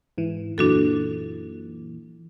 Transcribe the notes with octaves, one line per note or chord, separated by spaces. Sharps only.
G#2 E3
F#2 A#2 E3 D4 F#4 A4